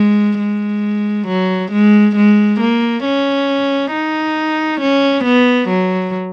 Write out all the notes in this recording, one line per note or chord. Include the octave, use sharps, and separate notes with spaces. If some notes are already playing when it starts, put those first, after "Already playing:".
Already playing: G#3
G#3
F#3
G#3
G#3
A#3
C#4
D#4
C#4
B3
F#3